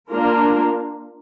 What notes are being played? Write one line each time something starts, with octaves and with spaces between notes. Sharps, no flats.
A#3 D4 F4 A#4